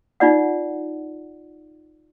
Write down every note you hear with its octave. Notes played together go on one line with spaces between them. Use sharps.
D#4 F4 D5 F#5